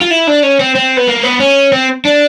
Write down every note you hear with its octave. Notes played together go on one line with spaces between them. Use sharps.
F4
E4
D4
C#4
C4
C4
B3
A#3
B3
C#4
C4
D4